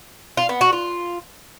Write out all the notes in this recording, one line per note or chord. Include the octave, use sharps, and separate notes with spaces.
F4
B3
F#4
F4